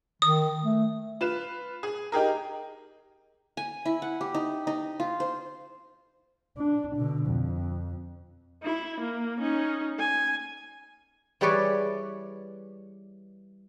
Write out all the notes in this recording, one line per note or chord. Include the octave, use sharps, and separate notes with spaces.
D#3 D#6
A3
F4 B4 E7
G#4
D#4 G4 G#4 A#4
G#5
E4
F#5
G4
D#4
D#4
F4
C5
D4
B2 D3
F2
E4
A#3
C#4 D#4
G#5
E3 G3 G#4 B4 C#5 D5